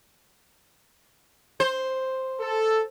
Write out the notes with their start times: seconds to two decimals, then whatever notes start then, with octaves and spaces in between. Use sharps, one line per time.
1.60 C5
2.40 A4